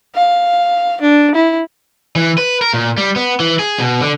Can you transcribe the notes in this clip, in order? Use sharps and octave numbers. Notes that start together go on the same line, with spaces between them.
F5
D4
E4
E3
B4
A#4
A#2
G3
B3
E3
G#4
B2
D3